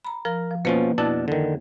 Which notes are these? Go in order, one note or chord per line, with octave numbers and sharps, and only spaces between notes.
A#5 B5
F3 A#4
F3
B2 F3 A#3 C#4 B4
F2 B2 D4 E4 A5
D3 D#3